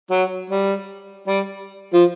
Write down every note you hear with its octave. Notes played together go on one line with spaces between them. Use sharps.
F#3
G3
G3
F3